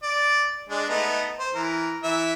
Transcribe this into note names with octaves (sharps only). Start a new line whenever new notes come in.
D5
G#3 D4
A3 B3 D#4
C5
E3 A#4
E3 E5